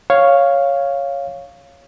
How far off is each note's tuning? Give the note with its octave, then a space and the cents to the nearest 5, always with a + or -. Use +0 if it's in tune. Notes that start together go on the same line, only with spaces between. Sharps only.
C#5 +0 F5 +0